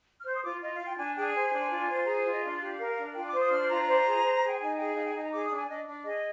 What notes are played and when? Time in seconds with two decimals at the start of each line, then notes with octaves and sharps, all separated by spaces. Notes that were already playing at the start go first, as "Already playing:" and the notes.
0.19 F6
0.26 C5 G6
0.36 D#6
0.43 F4 D6
0.62 F4 D#5
0.74 F5
0.80 F4
0.86 G5
0.98 D4 G#5
1.16 G#4 G5
1.34 C5 G#5
1.53 D4
1.71 F4
1.89 C5
2.06 G#4 A#5
2.25 F4
2.31 D#5
2.43 D4 F5
2.61 G4
2.79 A#4
2.97 D4
3.15 F4 G5
3.28 D6
3.33 C5
3.39 D#6
3.51 D4 F6
3.70 F4 A#5
3.88 C5
4.06 G#4
4.23 C5
4.42 G#4
4.48 G5
4.60 D#4 G#5
4.77 G#4 G5
4.96 D#4 F5
5.05 G5
5.14 D#4 G#5
5.24 A#5
5.33 G#4 D6
5.44 D#6
5.50 D4
5.57 G#5
5.68 D4 D#5
5.86 D4
6.04 G#4 D#5